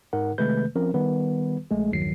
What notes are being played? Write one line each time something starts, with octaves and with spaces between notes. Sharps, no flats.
G#2 D#4 A#4 F#5
C3 D#3 G#3 A3 B4 G6
F3 C4 C#4 A#4
D#3 G3 B3 B4
A#1 G#3 A3 G#4
A#1 E2 G2 D#3 F#3 C7